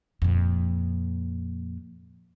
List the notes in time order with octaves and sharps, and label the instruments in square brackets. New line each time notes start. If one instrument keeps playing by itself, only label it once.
[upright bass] F2 A#2